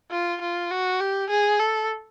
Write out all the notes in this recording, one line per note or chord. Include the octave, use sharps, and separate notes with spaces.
F4
F4
F#4
G4
G#4
A4